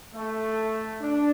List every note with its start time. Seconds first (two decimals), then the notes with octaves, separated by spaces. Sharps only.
0.14 A3
1.01 D4